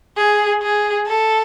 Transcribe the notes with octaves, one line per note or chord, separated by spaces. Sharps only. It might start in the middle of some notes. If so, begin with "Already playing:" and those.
G#4
G#4
A4